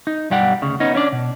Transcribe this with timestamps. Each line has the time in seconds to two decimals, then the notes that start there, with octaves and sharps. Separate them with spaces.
0.07 D#4
0.30 B1 G2 G3 G4 F#5
0.62 D2 C#3
0.80 B3 C#4 D#4
0.95 C#4 D4 D5
1.12 B2